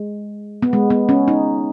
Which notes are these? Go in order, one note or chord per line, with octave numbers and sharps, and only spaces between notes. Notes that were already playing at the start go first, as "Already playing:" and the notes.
Already playing: G#3
B3
G#3
B3
C#4
D#4